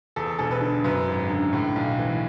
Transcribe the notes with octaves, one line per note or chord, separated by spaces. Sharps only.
E2 A4
E1 A4
B4
D3
F#2 B4
G#1
D3
A2
B1
E3